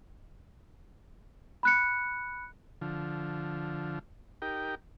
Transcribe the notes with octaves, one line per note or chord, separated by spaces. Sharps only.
B5 F#6 C#7
D3 F3
D#4 G4 A#4 G5